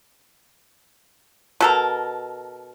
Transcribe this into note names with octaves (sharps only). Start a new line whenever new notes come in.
B2 A4 A#4